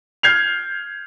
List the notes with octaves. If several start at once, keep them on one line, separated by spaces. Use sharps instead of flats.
F6 G6 G#6 C7 F7